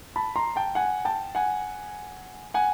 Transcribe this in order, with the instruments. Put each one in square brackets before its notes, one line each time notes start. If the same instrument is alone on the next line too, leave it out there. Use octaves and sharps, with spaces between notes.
[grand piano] A5 B5
A#5 C6
G5 A5
F#5 G#5
G5 A5
F#5 G#5
F#5 G#5